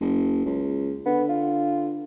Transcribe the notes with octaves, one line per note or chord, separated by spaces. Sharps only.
F#1
C#2
D3 B3
F4